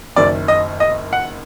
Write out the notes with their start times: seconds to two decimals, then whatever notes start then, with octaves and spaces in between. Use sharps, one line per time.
0.16 F#1 F#2 D#3 D5
0.48 D#5
0.80 D#5
1.13 F#5